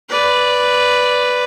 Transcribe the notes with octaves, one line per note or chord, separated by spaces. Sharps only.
B4 D5